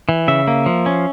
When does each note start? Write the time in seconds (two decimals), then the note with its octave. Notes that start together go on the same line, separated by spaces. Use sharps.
0.09 E3
0.28 C#3 E5
0.48 A#3
0.66 F3
0.86 C#4